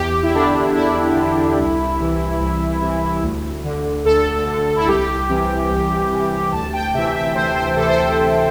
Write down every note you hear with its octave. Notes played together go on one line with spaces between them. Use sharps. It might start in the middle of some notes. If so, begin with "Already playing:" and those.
Already playing: E2 G4
G4
E4
D3 D4
E2 E4
D3
C2
C3 E3
C2
C3 E3
D2
D3
D2 A4
D3
E4
C2 G4
C3 E3
C2
C3 E3
D2 A5
G5
C3 E3 E5
E5
D2 C5
C5
C3 E3 A4
C5
A4